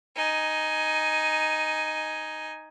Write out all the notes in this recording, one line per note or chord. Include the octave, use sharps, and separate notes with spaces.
D#4 G#5